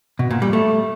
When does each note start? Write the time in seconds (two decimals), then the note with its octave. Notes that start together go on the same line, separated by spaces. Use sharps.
0.19 B2
0.31 A#2
0.42 G3
0.53 A3